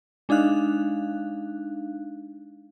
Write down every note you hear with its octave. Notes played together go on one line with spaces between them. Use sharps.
G#3 D4 D#4 F5 F#6